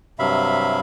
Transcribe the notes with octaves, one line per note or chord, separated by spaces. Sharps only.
G2 C3 F#3 E5 F5 B5